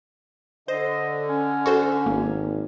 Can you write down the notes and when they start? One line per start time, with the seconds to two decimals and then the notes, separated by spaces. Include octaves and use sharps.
0.68 D3 C5 D#5
1.29 C#4
1.66 F#4 A4 C5
2.06 G#1 A#3